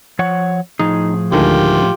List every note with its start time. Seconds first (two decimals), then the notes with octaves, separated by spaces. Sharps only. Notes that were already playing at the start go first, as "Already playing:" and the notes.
0.19 F3 C#5 F#5
0.80 A2 F3 D#4 G#4
1.32 D2 D#3 G#3 F4 G4